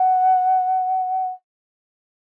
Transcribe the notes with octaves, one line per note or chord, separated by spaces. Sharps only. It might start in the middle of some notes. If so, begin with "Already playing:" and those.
Already playing: F#5